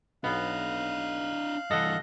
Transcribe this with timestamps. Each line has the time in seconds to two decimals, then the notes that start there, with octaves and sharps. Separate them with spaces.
0.24 B1 B3 D4 D#5 F5 F#6
1.71 G2 E3 A4 D#5 F#5 A5